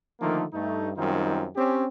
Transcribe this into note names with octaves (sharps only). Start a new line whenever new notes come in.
D3 D#3 F3 A3 A#3 D#4
G2 A3 D#4
F#2 D#3 G3 C4 D#4 F4
C4 C#4 G4